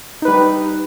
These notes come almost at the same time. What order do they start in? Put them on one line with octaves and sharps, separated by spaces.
D#4 B4 G3